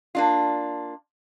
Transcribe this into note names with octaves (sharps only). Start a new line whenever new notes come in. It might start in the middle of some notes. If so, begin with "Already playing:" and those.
A#3 D4 F4